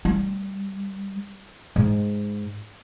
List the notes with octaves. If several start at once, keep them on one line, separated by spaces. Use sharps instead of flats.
G3
G#2